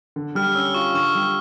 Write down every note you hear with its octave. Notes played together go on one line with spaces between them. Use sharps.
D3
G3 F6
C#4 E6
F4 C#6
D3 C#6
G3